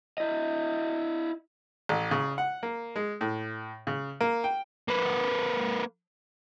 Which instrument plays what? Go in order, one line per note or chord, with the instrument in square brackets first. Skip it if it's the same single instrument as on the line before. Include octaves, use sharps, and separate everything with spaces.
[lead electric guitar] E4 D#5
[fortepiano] A1
C#3
F#5
A#3
G#3
A2
C#3
A#3
G5
[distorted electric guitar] A#3 B4